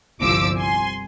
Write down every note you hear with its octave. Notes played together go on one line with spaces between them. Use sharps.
G1 C2 F3 D6 E6
G#5 C6